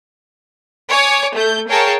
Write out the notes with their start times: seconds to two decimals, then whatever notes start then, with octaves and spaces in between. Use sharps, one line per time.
0.90 C#5 G#5 D6
1.35 A3 A4 G6
1.68 G#4 A#4 C#5 F5 G5 A5